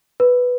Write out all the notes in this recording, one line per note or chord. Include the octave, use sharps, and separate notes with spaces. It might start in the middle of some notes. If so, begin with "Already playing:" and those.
B4